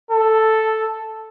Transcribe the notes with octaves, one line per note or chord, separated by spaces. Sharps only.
A4